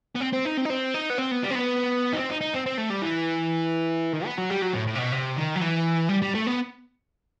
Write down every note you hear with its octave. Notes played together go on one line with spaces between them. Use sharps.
B3
C4
C4
D#4
C4
D#4
C4
D#4
B3
C4
B3
G3
C4
B3
D#4
C4
D#4
D#4
C4
C4
A3
G3
E3
D#3
B3
F#3
G3
F#3
A2
A2
C3
B2
C3
D#3
F#3
E3
G3
G3
A3
B3